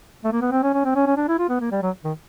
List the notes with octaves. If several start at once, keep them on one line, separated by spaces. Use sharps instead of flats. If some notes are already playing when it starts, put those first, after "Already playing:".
A3
A#3
B3
C4
C#4
C#4
C4
C#4
C#4
D4
E4
F4
B3
A#3
G3
F#3
D#3